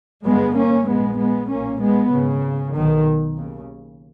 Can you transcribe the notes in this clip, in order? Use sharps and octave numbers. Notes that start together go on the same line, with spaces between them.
G1 G2 G#3 B3
A#3 C#4
A#1 G#2 G#3 B3
G#3 B3
B1 A#2 A#3 C#4
G#3 B3
G#1 G#2 C#3
B1 B2 D#3
D#2 C#3